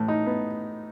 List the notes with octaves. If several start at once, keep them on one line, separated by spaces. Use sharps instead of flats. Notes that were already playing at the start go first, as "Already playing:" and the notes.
Already playing: A2 E3
D#4
B3